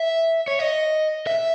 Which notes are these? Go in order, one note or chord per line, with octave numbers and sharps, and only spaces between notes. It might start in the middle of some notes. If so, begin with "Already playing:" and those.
Already playing: E5
C#5
D#5
E5